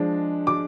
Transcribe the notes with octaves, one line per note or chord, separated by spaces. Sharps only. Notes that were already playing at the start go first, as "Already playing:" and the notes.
Already playing: F3 G#3 D4
D6